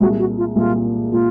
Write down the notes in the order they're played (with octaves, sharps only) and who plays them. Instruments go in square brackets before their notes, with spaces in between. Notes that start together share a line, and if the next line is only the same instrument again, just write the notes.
[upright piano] C2 A#2 G#3 [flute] F#4
[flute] F#4
F4
[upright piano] C2 A#2 G#3 [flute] F4
[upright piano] A#2 G#3 [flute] F4